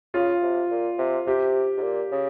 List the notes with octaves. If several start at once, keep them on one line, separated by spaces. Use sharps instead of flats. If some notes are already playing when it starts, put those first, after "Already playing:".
C#3 F4
C3
A#2
C3
C3 G4
G#2
A#2
C#3